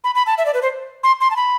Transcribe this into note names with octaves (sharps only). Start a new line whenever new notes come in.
B5
B5
A5
E5
D5
B4
C5
C6
C6
A5
B5